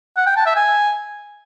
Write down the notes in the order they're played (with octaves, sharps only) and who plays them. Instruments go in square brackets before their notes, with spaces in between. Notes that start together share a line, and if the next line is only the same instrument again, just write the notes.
[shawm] F#5
G5
A5
E5
G#5